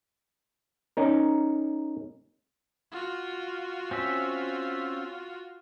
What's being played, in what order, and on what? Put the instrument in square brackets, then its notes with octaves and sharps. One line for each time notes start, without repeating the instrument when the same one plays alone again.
[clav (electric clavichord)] C#4 D#4 A#4
[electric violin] F4 F#4
[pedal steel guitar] C4 C#4 E5